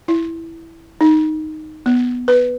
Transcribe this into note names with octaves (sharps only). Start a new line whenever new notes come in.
E4
D#4
B3
B4